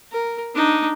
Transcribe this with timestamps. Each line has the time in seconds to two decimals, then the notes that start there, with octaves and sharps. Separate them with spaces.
0.12 A#4
0.55 D4 D#4